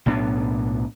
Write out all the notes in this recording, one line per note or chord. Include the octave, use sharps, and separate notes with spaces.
B1 A2 B3 D4